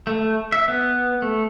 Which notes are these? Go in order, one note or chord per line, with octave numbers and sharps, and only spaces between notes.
A3
E5
B3
A3